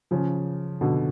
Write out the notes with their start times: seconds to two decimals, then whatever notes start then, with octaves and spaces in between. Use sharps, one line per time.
0.11 C#3 F3
0.81 B2 D3